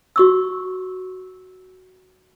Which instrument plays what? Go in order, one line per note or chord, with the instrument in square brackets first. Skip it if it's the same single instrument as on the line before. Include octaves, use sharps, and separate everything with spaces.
[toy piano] F#4 C#6 E6